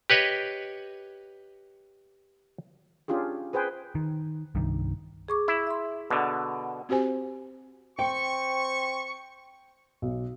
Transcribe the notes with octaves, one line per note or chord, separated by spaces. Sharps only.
G4 B4 C#5 D#5
C#4 D4 F4 G4 G#4
G#4 B4 C5 G5 G#5
D#3
C2 G2 D#3
G#4 C#6 D6
E4
E5 C6
B2 D3
C4 F#4 G4 C5 G#5
C4 G5 C#6
B1